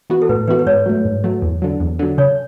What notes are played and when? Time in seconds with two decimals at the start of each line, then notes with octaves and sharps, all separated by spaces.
0.10 E3 B3 F#4
0.22 A4
0.29 A2 B4
0.48 E3 B3 F#4 B4
0.59 B4
0.66 G#2 C#5
0.86 F#3 A3
1.05 G#2
1.24 F#3 A3
1.42 E2
1.62 D3 F#3
1.80 E2
1.99 D3 F#3
2.18 C#3 C#5